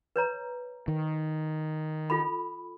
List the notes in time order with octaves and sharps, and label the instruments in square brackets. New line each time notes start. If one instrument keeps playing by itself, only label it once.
[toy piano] B4 C#5 A#5
[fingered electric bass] D#3
[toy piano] F4 A4 B5